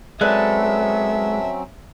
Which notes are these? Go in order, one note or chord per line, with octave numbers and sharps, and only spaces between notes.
F#3 G#3 C4 C#4 A4 B4 D5 E5